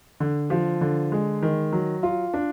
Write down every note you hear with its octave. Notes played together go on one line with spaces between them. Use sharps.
D3
F3
D3
G#3
D#3
F#3
F4
D4